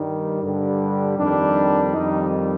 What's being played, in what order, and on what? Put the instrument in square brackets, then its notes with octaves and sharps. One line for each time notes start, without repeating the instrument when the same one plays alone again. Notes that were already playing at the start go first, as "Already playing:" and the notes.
Already playing: [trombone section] G2 D#3 G3
G2 D3 G3
F2 D#3 G3 D4
F2 D#3 G3 D#4